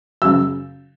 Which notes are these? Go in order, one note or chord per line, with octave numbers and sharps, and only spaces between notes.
F#2 C#3 F#3 E6